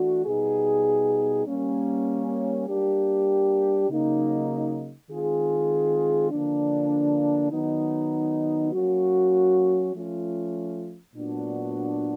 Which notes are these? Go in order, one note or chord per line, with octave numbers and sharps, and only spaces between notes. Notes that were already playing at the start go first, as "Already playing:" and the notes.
Already playing: E3 A3 D4 F#4
B2 G3 B3 D#4 G#4
G3 A#3 C#4
G3 A#3 D4 G4
C#3 F#3 A#3 D#4
D#3 G#3 C4 F4 G#4
D3 F3 A#3 D4
D#3 F#3 B3 D#4
F#3 A#3 C#4 F#4
F3 A3 C#4 F4
A#2 F#3 B3 D4 F#4